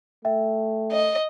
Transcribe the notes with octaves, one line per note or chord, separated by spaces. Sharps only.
A3 E5 G5
D#5